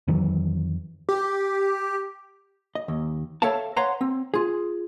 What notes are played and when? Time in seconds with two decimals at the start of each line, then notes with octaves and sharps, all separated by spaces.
0.08 F2 D#3 E3 F#3
1.09 G4
2.75 D#5
2.88 D#2
3.42 A4 C#5 E5 F5 G5 A5
3.76 B4 C#5 F5 F#5 A#5 C6
4.01 C4
4.34 F4 G#4